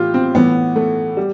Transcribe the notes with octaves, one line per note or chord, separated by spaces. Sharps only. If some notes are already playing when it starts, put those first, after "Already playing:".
Already playing: A2 E3 F4 G4
C4
A2 E3 B3
A3
G3